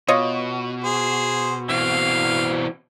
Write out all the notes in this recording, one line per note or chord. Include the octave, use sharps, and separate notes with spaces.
B2 F4 C#5 D#5
G#4 C5
E3 C4 F5